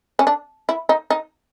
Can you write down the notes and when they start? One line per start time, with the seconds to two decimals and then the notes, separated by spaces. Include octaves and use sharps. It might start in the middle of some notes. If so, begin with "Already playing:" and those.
0.19 C#4
0.27 D4
0.69 E4
0.89 D#4
1.10 D#4